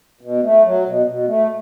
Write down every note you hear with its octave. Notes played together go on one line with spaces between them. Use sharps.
B2
A3
F#3
B2
B2
A3